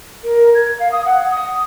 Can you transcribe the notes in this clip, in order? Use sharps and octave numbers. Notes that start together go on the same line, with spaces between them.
A#4
G#6
F5
D#6
F#5
D#6